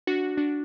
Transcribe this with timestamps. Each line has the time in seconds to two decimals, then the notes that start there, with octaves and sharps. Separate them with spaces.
0.07 D4 F#4
0.37 D4 F#4